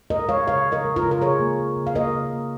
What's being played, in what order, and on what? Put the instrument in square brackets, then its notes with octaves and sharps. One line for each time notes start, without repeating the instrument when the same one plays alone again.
[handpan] G#3 A#4 D#5
G#3 C#5 F5
C#3 C#5 F5
C#3
A#4 D#5
G#3
F4 A#4
C#3
A#4
C#3 G#4 C#5
A#3
A#3
C#3
F5
A#3 A#4 D#5
C#3
A#3